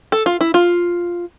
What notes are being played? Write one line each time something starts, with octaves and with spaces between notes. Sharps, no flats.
A4
F4
E4
F4